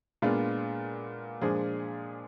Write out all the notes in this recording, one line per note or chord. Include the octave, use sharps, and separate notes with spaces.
A#2 G#3 B3 D4 F4
A#2 F3 G#3 D4 G#4